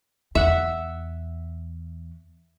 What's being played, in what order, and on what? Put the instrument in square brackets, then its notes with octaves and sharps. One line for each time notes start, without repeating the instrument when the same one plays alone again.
[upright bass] E2 [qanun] E5 F#5